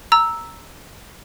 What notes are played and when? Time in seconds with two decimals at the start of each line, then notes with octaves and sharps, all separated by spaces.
0.12 A#5 E6